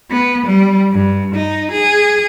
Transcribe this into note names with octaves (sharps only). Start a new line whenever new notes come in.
B3
G3
G2
D#4
G#4